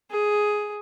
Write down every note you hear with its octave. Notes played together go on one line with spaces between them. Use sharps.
G#4